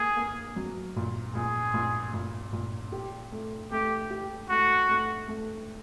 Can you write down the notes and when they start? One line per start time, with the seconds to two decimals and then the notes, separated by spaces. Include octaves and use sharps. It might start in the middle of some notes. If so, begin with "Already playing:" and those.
Already playing: A#3 G#4
0.17 A#3
0.56 F#3
0.96 A#2
1.35 A#2 G#4
1.74 A#2
2.14 A#2
2.53 A#2
2.92 G4
3.32 A3
3.72 A3 G4
4.10 G4
4.49 A3 F#4
4.89 A3
5.28 A3